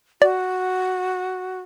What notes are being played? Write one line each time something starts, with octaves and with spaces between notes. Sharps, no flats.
F#4 D5